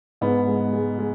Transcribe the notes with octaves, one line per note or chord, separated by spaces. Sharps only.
G#2 B3
G#3
G#3
G#3